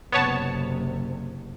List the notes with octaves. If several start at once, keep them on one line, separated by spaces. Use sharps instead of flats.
F#1 C3 B3 C#5 A5